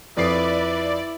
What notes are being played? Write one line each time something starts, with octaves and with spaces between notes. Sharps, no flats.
F2 E4 B4 D5 D#6 C7